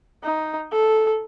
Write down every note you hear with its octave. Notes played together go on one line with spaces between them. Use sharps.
D#4
A4